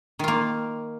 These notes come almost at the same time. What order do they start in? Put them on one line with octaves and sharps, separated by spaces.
D#3 F4 A#3